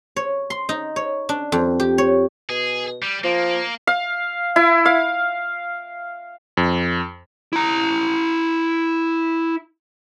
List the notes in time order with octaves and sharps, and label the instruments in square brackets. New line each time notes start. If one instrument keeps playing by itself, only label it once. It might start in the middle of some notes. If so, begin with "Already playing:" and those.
[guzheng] C#5
C6
D#4
C#5
D4
F2
G4
C#5
[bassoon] B2 [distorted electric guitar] G#4
[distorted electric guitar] G3
[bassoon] F3 [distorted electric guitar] A#3
[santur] F5
E4
F5
[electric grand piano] F2
[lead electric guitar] E4 A#5